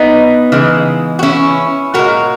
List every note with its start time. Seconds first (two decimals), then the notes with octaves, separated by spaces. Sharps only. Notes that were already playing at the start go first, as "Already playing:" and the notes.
Already playing: B3 D#4
0.52 C#3 E3 G#3
1.19 F#4
1.23 C#4 E4
1.94 A#2 G#3 F#4 A#4